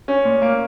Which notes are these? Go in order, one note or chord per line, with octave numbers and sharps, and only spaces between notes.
C#4
A#2
A#3